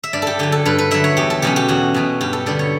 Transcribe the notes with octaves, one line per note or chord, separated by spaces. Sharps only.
E5
G2 D5
G4 A4
D3 F#3 G4
A4
G2 B4
B4
D3 F#3 E5
C#5
E2 G4
A4
B2 F#3 C#4 G4
G4
E2 F#4
B2 F#3 C#4
G2 G4
A4
D3 G3 B3 D5
C#5